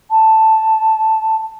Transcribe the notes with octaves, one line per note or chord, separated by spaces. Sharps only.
A5